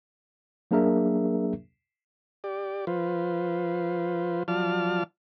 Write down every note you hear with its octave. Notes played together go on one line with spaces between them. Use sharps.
F#3 A#3 D4 G#4 A#4 E5
G4 D5
F3 F4 B4 C5
F3 F#3 F4 D5 A5 F6